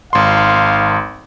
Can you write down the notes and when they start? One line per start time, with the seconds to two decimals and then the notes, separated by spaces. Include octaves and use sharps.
0.13 G#1 F5 C6